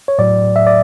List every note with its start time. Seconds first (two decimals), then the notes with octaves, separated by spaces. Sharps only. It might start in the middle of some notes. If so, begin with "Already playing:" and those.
0.08 C#5
0.19 A2 F#3 D5
0.56 E5
0.67 D5